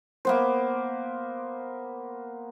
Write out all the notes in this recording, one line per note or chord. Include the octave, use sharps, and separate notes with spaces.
A#3 B3 C5